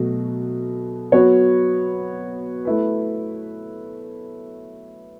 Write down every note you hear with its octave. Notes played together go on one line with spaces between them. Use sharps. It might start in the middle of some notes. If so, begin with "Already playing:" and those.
Already playing: B2 F#3 A3
F#3 B3 F#4 C#5
A3 E4 B4